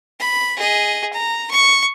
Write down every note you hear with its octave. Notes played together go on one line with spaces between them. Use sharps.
B5
G#4 D#5
A#5
C#6